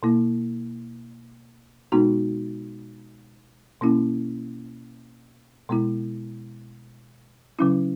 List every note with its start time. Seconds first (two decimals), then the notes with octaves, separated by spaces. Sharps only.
0.03 B2 A#3 E4
1.92 B2 G#3 B3 D#4 F#4
3.81 B2 A#3 C#4 E4
5.69 B2 G#3 B3 E4
7.59 C#3 F#3 C#4 E4